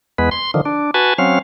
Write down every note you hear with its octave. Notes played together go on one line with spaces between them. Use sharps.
E2 G#3 B3 B4
C6
D3 D#3 F3
D4
F#4 B4 G#5 A5
F#3 C4 C#4 F5